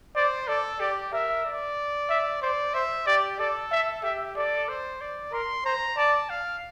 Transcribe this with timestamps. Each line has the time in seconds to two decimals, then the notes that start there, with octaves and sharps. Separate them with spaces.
0.16 C5 D5
0.48 A4 D5
0.80 G4 D5
1.12 A#4 E5
1.45 D5
2.09 E5
2.42 C5 D5
2.74 C5 E5
3.06 G4 D5
3.39 A4 D5
3.71 E5
4.03 G4 E5
4.36 A4 D5
4.68 C5
5.01 D5
5.33 A#4 C6
5.65 C5 A#5
5.97 D5 A5
6.30 F5